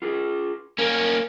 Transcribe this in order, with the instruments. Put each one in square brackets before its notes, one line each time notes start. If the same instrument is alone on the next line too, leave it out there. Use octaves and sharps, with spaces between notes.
[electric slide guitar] F4 G#4
[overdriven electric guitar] A#3 C#4 [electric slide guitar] A#4